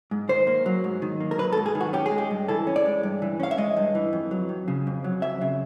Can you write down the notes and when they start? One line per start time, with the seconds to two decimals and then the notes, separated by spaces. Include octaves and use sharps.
0.11 G#2
0.29 D#3 C5
0.47 A#3
0.66 F#3
0.84 G#2
1.02 D#3
1.20 A#3
1.31 A#4
1.38 F#3 B4
1.52 A4
1.57 G#2
1.66 G#4
1.75 D#3
1.81 F#4
1.93 C#4 G4
2.06 G#4
2.11 G#3
2.18 G4
2.31 G2
2.48 E3 A4
2.67 C#4
2.76 D5
2.86 G#3
3.03 G2
3.22 E3
3.40 C#4 F5
3.51 E5
3.58 G#3 D#5
3.77 G2
3.95 E3
4.13 F2
4.31 F#3
4.49 F2
4.68 C#3
4.87 F2
5.04 F#3
5.22 F2 E5
5.41 C#3